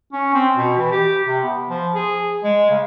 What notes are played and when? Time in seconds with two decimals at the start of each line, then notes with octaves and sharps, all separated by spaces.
0.12 C#4
0.34 C4
0.57 B2
0.77 E3
0.91 G4
1.27 C3
1.43 B3
1.69 F3
1.94 G#4
2.44 G#3
2.70 C#3